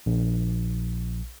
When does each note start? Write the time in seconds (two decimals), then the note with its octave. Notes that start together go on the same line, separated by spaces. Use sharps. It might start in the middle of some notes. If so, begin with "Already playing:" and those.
0.06 A#1